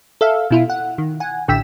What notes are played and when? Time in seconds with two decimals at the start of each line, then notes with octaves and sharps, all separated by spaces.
0.21 A4 E5 F5
0.51 B2 E4 F4
0.70 F#5
0.98 D#3
1.20 F#5 G#5
1.48 A1 D3 G5 E6 B6 E7